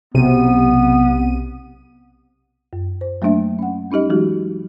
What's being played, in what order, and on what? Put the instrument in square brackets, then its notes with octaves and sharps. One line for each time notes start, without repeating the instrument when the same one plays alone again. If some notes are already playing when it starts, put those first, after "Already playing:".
[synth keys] B1 C3 D#7 [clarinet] B3
[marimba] F#2
C5
F#3 A3 A#3 D4 E5
C#4 F#5
G3 C#4 D#4 G4 D#5
E3 F#3 G#3 D#4 F#4 G4